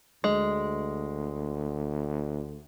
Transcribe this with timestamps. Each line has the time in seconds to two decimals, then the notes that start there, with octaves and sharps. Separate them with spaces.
0.24 D2 G#3